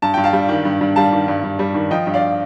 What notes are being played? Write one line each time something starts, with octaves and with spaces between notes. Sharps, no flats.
G2 A5
G2 G5
F5 A5
G3
D#3
G2
G2
G3 F5 A5
D#3
G2
G2
G3
D#3
F3 D#5 G5
G2
D5 F5